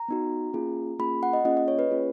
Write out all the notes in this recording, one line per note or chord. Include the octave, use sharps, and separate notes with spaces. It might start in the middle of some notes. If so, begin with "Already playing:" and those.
Already playing: A#5
B3 D#4 F#4
A#3 C#4 F4 G#4
A#3 C#4 F4 G#4 B5
F#5
D#5
A#3 C#4 F4 G#4 D#5
D#5
C#5
B4
A#3 C#4 F4 G#4